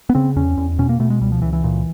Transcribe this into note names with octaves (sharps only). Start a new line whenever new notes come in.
B3
C#3 C4
E2 C#4
E2
B2 C#4
A#3
B2 A3
G#3
C#2 G3
F3
C#2 E3
E3
A#2